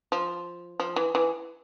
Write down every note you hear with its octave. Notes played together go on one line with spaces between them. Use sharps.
F3
F3
E3
E3